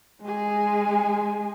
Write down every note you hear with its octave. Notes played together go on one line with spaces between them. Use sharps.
G#3 G#4